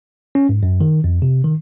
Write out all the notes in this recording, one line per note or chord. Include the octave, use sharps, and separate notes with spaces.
C#4
G#2
F#2
D#3
F2
C3
D#3